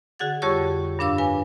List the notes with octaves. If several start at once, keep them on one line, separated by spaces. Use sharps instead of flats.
D3 F#4 G#4 F#5 A6
F2 G3 G4 C#5 C#6 E6
G2 A#2 D4 F5 D6 E6
B4 F5 G#5